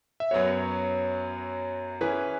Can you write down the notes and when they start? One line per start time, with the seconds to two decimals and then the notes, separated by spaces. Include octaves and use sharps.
0.20 E5
0.31 F#2 F#3 B3 F#4 C#5
2.01 E3 C#4 G#4 B4